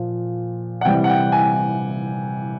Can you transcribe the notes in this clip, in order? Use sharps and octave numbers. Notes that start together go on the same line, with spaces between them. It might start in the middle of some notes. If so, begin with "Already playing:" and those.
Already playing: A#2 F3
F#5
C3 E3 G3 G5
F#5
G5
G#5